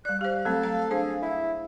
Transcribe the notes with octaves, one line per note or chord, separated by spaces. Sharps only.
G3 D5 F#6
G4 C5 F5
F#3 A3 C4 A4
A#5
D4 G#4 C5
E4